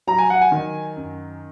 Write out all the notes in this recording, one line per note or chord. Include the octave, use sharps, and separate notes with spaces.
F#3 A#5
G#5
F#5
G#5
D#3
F#2